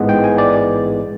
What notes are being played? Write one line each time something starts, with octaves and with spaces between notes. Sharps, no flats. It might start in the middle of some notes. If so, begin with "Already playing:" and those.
Already playing: A1 G#2 E3 G#3 B3
G5
G#5
D5